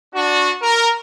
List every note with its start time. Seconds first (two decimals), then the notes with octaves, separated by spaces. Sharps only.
0.15 D4 F#4
0.62 A#4